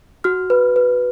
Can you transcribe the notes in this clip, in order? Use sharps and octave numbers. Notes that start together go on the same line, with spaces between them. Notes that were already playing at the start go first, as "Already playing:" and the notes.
F#4 F6
B4
B4